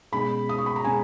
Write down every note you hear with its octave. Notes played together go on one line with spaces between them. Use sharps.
B2 G#3 C#4 B5
D#6
C#6
B5
A#5
B2 G#3 C#4 G#5